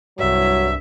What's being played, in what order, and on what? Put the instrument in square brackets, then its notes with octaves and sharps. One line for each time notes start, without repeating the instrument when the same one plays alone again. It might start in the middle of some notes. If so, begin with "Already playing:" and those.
[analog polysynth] C2 G2 [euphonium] F#3 [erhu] E5